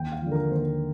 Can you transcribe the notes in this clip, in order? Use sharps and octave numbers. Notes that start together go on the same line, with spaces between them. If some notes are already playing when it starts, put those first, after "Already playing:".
Already playing: D#2 G5
F5
D3 F3
A#4
D#2 C5